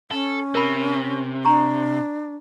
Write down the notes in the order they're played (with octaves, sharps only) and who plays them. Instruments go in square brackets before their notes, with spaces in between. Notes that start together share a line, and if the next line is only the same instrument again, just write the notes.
[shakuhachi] C#4 [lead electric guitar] A4
[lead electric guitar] C3 [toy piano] A#4 B5
[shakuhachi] D4 [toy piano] A#5 C#6